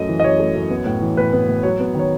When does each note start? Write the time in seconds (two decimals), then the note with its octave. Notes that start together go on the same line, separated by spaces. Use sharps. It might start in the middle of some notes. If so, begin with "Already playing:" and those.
Already playing: F#2 A3 D#5
0.08 E3
0.20 D#5
0.24 F#2 C#5
0.39 A3
0.55 F#2
0.70 B3
0.86 A2
1.01 E3
1.17 A2 B4
1.33 B3
1.48 A2
1.63 F#3 C#5
1.80 B3
1.94 D#3
1.99 C#5